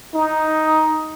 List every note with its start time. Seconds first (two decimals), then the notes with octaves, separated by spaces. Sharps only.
0.14 D#4